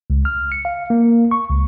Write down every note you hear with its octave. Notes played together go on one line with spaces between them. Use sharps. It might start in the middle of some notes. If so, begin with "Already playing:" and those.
C#2
F6
C#7
F5
A#3
C#6
C#2